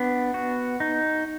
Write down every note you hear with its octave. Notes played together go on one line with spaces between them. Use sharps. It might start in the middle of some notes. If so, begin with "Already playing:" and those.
Already playing: B3 D4
F#4
D#4